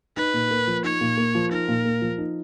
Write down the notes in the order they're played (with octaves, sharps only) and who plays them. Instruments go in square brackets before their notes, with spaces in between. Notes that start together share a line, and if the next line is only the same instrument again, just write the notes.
[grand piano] D#4 [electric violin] B4
[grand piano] A#2
A#3
F3
[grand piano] D#4 [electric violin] C#5
[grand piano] A#2
A#3
F3
[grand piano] D#4 [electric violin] A#4
[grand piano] A#2
A#3
F3
D#4